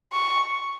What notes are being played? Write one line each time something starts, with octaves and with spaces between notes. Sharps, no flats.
C#6